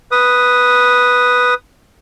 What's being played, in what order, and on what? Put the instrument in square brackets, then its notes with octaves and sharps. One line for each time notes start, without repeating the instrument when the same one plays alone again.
[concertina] B4 D#6